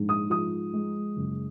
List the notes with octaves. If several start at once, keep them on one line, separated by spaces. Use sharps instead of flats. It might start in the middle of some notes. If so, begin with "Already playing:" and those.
Already playing: A#1 G#2
D#6
F3 D#6
G#3
F#1